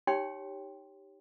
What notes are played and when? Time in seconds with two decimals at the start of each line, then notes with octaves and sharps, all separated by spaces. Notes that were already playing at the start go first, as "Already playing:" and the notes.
0.07 D#4 G4 C#5 G5 C6